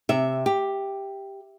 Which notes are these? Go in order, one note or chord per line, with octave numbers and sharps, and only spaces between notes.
C3 E5
G4